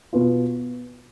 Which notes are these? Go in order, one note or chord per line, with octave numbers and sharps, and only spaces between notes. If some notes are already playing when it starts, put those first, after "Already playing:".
B2 B3 F4